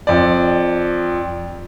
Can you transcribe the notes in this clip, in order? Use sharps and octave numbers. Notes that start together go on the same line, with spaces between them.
F2 D5